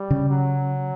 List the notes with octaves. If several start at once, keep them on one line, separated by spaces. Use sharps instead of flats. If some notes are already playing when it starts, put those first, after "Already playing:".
Already playing: G3
C#3
F#3